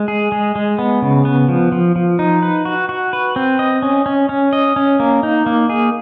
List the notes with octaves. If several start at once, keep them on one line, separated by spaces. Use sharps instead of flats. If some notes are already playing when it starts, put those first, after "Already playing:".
Already playing: G#3
G#4
G#3
G#3
B3
C#3
B3
F3
F3
F3
D#4
B4
F#4
F#4
B4
C4
D#5
C#4
C#4
C#4
D#5
C#4
A#3
D#4
A#3
G#4